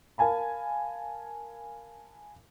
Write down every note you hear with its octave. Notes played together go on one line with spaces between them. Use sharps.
A#4 F5 G#5 A5 B5